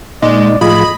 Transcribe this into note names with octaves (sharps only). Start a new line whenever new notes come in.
A#2 G#3 D#4 D5
A2 F3 F4 G#4 D#5 B5